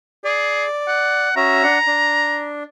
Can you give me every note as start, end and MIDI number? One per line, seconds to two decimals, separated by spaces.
0.24 0.64 68
0.24 1.29 74
0.87 1.35 78
1.36 1.63 61
1.36 1.63 66
1.36 1.63 76
1.36 2.49 82
1.63 1.78 62
1.63 1.78 78
1.87 2.63 62